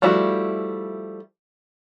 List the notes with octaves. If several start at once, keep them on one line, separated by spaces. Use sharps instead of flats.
F3 G3 A3 E4 F#4